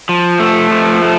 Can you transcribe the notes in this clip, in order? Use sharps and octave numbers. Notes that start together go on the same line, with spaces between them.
F3
A3
F3
A3